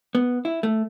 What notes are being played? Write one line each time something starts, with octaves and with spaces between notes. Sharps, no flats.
B3
E4
A3